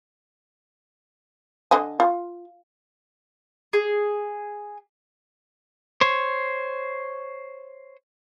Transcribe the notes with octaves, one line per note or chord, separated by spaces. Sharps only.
D3 D#5 G#5
F4
G#4
C5 C#5